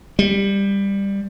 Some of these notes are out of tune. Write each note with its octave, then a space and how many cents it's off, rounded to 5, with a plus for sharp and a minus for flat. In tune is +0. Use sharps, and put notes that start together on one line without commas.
G3 +15